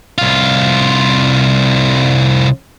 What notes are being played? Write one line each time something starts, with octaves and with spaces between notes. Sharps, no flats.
C2 F4